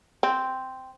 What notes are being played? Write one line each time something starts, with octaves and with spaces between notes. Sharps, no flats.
C4